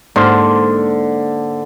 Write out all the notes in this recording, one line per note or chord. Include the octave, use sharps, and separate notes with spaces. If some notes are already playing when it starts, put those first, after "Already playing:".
G#2 D3 A#3 C5